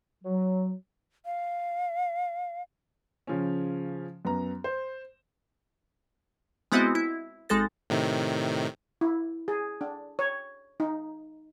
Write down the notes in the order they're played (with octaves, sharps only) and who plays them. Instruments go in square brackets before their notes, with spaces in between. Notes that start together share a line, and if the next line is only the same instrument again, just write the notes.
[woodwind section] F#3
[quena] F5
[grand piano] C#3 F3 C#4
F#2 B3 A#5
C5
[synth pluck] G#3 B3 C4 E4 F#4 D#5
E4
G#1 G#3 D#4 A4 A6 A#6
[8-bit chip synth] A2 C3 D#3
[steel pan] E4
G#4
D4
C#5
D#4